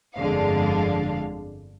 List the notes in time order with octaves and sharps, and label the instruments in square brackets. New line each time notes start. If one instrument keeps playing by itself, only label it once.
[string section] G1 F2 D3 G#3 D4 F5